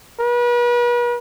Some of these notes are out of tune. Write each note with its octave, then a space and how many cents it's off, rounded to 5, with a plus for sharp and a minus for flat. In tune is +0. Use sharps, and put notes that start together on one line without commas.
B4 -40